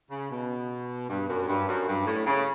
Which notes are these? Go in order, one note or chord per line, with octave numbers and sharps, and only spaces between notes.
C#3
B2
G2
F#2
G2
F#2
G2
A2
C#3